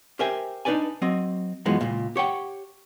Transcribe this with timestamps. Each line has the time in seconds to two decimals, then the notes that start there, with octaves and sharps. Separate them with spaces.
0.19 G4 A#4 C5 E5 G5 G#5
0.65 D4 D#4 A4 B4 D5 G#5
1.02 F#3 C4 D#5
1.66 F#2 E3 F3 G#3 B3 F#4
1.81 C#2 A#2
2.16 G4 C#5 F#5 G5